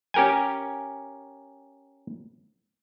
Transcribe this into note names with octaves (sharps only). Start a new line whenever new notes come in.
C#4 G4 A#4 G5 G#5